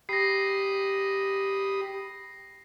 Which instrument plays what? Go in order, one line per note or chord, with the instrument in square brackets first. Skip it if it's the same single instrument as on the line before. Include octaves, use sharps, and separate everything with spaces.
[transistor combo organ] G4 B5 D#6 [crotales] A#6 C7